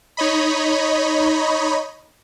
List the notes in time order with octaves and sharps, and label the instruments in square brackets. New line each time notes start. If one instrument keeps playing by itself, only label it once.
[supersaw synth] D#4 C#5 D#5 B5